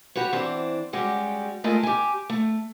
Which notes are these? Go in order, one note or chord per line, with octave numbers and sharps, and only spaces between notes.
F#4 G4 B4 C#5
E3 C4 D4 C5
G3 G#3 C#4 F#4 G4
G#3 A3 F4 A#4 D#5 G#5
G4 G#5
A3